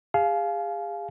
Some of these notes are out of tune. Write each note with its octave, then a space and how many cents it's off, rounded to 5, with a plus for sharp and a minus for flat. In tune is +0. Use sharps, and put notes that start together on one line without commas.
G#4 -35 F5 +0 G#5 +40